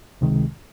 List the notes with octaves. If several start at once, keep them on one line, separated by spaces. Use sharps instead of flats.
C#2 C3 D#3 G#3